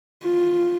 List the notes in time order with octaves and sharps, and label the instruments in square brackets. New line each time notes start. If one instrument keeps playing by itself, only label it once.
[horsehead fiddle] F4